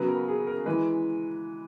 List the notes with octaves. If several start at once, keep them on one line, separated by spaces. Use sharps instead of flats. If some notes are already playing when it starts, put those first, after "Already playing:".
Already playing: C#3 F#3 B3 B4
A#4
G#4
A#4
E3 G#3 B4